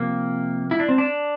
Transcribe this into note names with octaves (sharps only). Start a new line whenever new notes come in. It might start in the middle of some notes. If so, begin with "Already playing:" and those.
Already playing: C3 F3 A#3
E4
D4
C4
D4